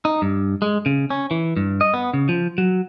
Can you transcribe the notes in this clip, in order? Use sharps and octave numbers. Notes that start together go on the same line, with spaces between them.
D#4
G2
G#3
C#3
C#4
E3
G2
D#5
B3
C#3
F3
F#3